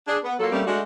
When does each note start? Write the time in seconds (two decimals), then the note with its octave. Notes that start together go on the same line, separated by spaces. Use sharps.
0.07 D4 G#4
0.24 B3
0.39 F#3 A#3 F4 A4
0.52 G3 A3 A#3 C4 C#4
0.67 G#3 A3 D4 F#4